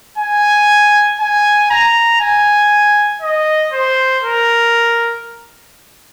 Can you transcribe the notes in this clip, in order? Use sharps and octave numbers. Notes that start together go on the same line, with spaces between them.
G#5
G#5
A#5
G#5
D#5
C5
A#4